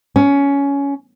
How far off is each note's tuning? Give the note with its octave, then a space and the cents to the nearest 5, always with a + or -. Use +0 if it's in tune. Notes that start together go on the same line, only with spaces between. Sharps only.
C#4 +15